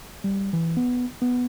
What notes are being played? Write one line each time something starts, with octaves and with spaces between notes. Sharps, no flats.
G3
E3
B3
B3